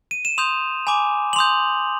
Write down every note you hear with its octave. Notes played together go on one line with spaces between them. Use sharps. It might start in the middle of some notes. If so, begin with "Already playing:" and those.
D#7
E7
C6 D#6 G6 F7
G#5 B5 D6
F#7
C6 D#6 G6 F7